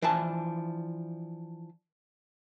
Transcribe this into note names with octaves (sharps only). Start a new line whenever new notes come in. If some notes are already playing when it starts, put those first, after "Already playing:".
E3 F3 D4 A5